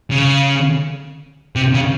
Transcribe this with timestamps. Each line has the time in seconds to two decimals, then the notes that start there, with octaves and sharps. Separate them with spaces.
0.11 C#3
1.56 C3
1.74 C#3